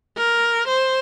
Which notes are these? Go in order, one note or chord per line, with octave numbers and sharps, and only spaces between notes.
A#4
C5